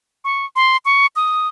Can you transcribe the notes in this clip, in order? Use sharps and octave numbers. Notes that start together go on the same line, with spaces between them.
C#6
C6
C#6
D#6